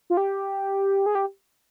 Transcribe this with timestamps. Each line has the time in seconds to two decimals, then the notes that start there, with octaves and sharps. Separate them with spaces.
0.10 F4
0.17 G4
1.06 G#4
1.15 G4